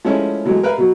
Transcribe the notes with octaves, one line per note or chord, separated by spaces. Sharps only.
F3 G#3 A3 C#4 E4
B2 E3 F#3 G#3 A3
A#4 B4 E5 F5
B2 F#3